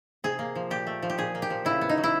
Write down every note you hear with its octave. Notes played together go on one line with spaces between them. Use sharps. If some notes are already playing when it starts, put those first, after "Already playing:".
C3 G#4
A#3
F3
A#2 G4
A3
F3
G4
A#2 G#4
A#3
G4
F3
C#3 E4
B3
D#4
F#3
E4